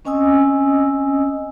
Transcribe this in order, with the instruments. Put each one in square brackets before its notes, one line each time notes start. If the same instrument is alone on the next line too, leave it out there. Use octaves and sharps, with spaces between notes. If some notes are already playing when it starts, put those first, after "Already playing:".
[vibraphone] C4 C#4 D#5 G#5 D#6 E6